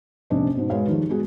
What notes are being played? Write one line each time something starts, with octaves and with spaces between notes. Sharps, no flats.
A#1 C3 C#4 D4 D#5
G#2 B2
G#3 F#4 G#4 B4 C#5 F5
D#3 F3 G3
G#3 B3 F#4 G#4